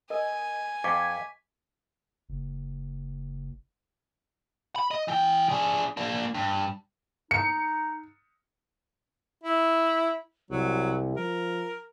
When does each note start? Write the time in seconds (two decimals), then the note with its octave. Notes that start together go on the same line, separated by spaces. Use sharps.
0.10 A#4 D#5 G#5
0.84 F2 D#5 C#6 D6 G#6 B6
2.29 F#1
4.76 B5
4.91 D#5
5.08 E3 G5
5.49 D4 G#4
5.97 A#3 D4
6.34 G2
7.31 D#4 C#7
9.44 E4
10.51 C2 F#3
11.17 F3 A#4